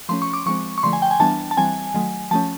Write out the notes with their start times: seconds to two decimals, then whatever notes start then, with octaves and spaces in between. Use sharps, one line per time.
0.09 F3 A3 C#4 C6
0.22 C#6
0.33 D6
0.46 F3 G#3 C4 C#6
0.78 C#6
0.83 D3 F3 A3 C6
0.93 G#5
1.02 G5
1.11 G#5
1.20 E3 G3 B3 D4 A5
1.51 A5
1.57 E3 G3 C4 G#5
1.94 D#3 F#3 A3
2.31 F3 A3 C#4 A5